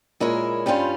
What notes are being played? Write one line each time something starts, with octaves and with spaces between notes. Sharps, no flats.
A#2 G#3 E4 A#4 C#5
G2 G3 C#4 F4 C5